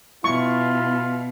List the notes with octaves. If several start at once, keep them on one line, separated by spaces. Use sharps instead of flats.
B2 E4 F4 C#6